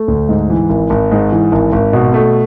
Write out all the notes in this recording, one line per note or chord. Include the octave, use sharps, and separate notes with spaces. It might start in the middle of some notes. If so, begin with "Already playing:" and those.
Already playing: A3
D2
G#2
E3
G#1
G#1
G#2
E3
G#1
G#1
B2
A3